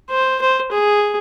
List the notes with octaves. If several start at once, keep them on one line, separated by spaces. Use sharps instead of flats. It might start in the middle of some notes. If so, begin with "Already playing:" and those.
C5
C5
G#4